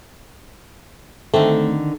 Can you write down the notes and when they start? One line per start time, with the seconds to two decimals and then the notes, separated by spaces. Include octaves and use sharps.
1.34 D3 D#3 A3 C4